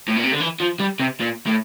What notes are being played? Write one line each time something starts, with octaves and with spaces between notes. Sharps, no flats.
A2
A#2
C3
D3
E3
F3
G3
C3
A#2
A2